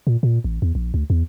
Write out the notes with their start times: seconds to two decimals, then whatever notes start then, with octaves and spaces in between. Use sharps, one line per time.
0.07 A#2
0.23 A#2
0.44 A1
0.62 E2
0.75 A#1
0.94 D2
1.10 E2